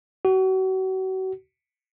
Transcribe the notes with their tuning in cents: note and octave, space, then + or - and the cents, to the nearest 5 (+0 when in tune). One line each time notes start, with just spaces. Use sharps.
F#4 +35